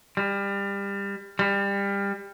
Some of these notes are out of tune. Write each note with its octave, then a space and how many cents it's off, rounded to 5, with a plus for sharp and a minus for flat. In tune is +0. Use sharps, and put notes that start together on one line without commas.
G3 +25
G3 +25